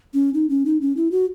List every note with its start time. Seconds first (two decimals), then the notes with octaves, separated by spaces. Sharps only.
0.14 C#4
0.34 D#4
0.50 C#4
0.66 D#4
0.81 C#4
0.97 E4
1.12 F#4